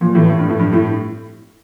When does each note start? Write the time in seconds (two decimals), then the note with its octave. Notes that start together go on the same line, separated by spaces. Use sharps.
0.01 A#2 F3
0.15 A2 E3
0.29 A2
0.39 G2
0.49 A2
0.59 G2 F3
0.73 A2 E4